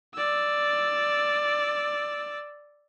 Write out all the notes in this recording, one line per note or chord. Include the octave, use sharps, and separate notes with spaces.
D5 E6